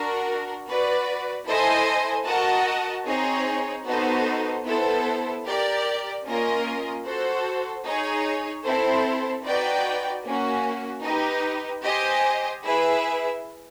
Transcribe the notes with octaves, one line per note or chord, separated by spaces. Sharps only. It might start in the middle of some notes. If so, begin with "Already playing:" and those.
Already playing: D4 F#4 A#4
F#4 B4 D5
E4 A4 C5 D#5 G#5
F#4 A#4 D#5 F#5 A5
C4 D#4 G#4 C#5
B3 D#4 F#4 A4 C5
B3 E4 A4 C5
G4 A#4 D5
A#3 C#4 F4 A#4 D#5
F#4 A4 C5
D#4 G#4 C#5
C4 E4 A4 C5
D#4 F#4 B4 D5 G5
A#3 C#4 F#4
D#4 G4 B4
G4 C5 D#5 G#5
E4 G#4 B4 E5